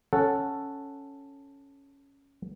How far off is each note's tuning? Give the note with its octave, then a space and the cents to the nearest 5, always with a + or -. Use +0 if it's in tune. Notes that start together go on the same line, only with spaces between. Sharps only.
C#4 +0 A4 +0 F#5 +0